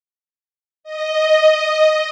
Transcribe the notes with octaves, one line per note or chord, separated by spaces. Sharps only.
D#5